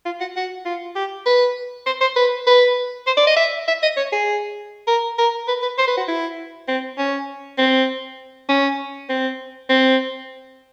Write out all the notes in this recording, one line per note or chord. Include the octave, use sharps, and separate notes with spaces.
F4
F#4
F#4
F4
G4
B4
C5
C5
B4
B4
C5
D5
D#5
E5
E5
D#5
C#5
G#4
A#4
A#4
B4
B4
C5
B4
F#4
E4
C4
C#4
C4
C#4
C4
C4